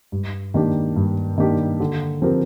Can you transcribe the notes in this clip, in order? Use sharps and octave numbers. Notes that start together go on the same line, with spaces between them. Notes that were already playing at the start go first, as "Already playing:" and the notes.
G2
D#3 A#3 D4 G4
G2
D#3 A#3 D4 G4
D3
F3 C4 G4 A#4